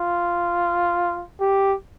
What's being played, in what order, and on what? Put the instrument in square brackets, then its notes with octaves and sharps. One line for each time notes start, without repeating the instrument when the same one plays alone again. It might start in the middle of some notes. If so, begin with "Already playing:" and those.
Already playing: [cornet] F4
G4